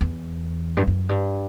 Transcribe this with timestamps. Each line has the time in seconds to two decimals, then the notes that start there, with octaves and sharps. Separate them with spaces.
0.01 E2
0.77 G2
0.87 F#2
1.09 G2